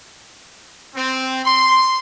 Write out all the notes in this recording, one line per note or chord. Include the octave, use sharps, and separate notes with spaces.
C4
C6